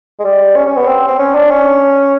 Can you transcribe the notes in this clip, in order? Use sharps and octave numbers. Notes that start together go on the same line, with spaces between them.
G#3
G3
C#4
C#4
B3
C4
C4
C#4
D4
C#4